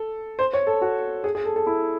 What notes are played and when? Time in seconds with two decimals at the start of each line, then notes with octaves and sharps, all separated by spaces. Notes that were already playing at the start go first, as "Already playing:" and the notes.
Already playing: A4
0.39 C5
0.53 C#5
0.67 A4
0.82 F#4
1.24 G#4
1.35 G#4
1.45 A4
1.56 A4
1.67 E4